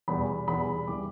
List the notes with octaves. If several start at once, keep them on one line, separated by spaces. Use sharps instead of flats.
E2 B2 G3 B5
E2 B2 G3 B5
E3 G3 D6